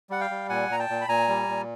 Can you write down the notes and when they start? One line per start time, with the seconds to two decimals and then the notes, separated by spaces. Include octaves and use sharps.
0.10 G3 F#5
0.20 F5 G5
0.30 G3
0.49 A#2 F#5 G#5
0.69 A#2 A#5
0.79 G5 A5
0.89 A#2
1.01 B5
1.08 A#2 G#5 A#5
1.28 G3
1.48 A#2